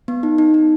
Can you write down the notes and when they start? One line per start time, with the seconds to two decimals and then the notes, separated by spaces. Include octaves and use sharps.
0.08 B3
0.23 D#4
0.38 D#4
0.54 D#4